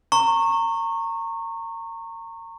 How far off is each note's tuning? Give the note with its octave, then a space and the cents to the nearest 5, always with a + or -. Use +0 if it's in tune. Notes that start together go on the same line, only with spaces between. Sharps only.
A#5 -30 C#6 -20